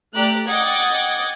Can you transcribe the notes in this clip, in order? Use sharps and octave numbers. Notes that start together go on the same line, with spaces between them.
A3 G4 D5 A#5 F#6
D#5 F#5 G5 D6 G#6 A6